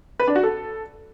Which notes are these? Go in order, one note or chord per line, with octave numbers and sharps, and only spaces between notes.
B4
D4
F#4
A4